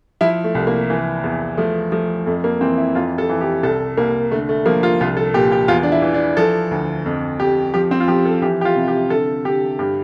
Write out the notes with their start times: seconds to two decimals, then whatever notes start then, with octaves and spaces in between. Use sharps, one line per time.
0.21 F3 E4
0.44 A3
0.55 C2
0.67 A#3
0.90 E3
1.24 E2
1.57 F3 A3
1.92 F3 A3
2.26 F2 A3
2.44 A#3
2.61 E3 C4
2.78 E4
2.95 F2 F4
3.18 A4
3.29 E3
3.41 G4
3.63 C2 A4
3.97 C2 A#3
4.31 D3 A3
4.49 A3
4.66 F3 A#3
4.83 F4
5.01 C2 F4
5.17 A4
5.34 A#2 G4
5.52 G4
5.68 E2 F4
5.83 D4
5.92 E4
6.02 E3
6.14 D4
6.37 F3 A4
6.71 D2
7.06 F2
7.40 F2 G4
7.74 F3 G4
7.91 C4
8.00 F4
8.08 F3 G4
8.25 A4
8.42 E3 G4
8.61 G4
8.65 F4
8.76 C3
8.88 G4
9.10 D3 A4
9.45 D3 G4
9.79 G2 G4